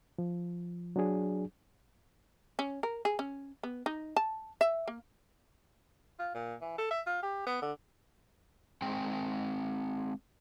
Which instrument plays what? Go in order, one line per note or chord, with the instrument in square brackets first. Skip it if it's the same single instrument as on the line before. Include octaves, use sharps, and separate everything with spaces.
[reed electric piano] F3
F#3 D4 G#4
[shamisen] C#4
A#4
G#4
C#4
B3
D#4
A5
E5
A#3
[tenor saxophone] F4
A#2
E3
A4
E5
F4
G4
B3
D3
[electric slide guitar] G#3 C4 G5